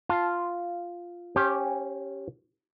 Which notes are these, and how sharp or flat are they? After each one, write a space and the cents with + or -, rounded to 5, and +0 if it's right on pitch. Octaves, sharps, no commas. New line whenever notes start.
F4 +0 A5 +0
C#4 +0 G4 +0 C5 +35